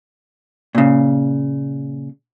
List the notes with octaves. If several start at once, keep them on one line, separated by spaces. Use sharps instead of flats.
A#2 C#3